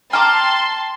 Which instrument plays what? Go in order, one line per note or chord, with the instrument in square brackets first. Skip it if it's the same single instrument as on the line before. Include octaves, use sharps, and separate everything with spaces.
[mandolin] G5 A#5 D6 [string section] A5 C6 [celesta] F6